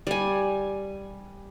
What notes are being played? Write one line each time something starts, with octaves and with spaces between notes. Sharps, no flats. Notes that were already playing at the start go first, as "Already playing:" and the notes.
G3 G#5